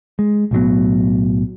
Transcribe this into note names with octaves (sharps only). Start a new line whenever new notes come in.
G#3
B1 A2 F#3 B3